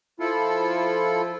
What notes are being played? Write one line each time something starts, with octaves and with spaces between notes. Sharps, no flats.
F3 E4 F4 A4